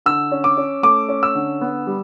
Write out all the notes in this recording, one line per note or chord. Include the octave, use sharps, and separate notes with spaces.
D3 E6
C#4
D6
C#4
A3 D6
C#4
E6
D3
B3
G3